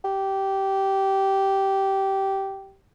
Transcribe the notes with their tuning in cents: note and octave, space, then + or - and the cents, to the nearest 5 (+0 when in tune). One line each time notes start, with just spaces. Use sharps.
G4 -15